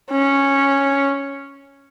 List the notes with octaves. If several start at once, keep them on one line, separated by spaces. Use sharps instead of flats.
C#4